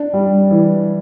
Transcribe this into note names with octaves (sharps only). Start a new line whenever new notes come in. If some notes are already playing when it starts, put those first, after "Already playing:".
Already playing: D4
G3
E3